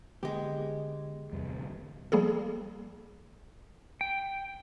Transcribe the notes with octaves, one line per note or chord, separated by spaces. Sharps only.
D3 G#3 A#3 B3 G4
D1 E2 C3 G3
D2
F3 G3 A#3 G#4 A4
G5